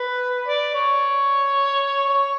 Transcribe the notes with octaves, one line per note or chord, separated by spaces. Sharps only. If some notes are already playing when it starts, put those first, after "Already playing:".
Already playing: B4
D5
C#5
C#5